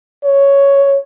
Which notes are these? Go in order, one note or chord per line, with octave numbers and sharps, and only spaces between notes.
C#5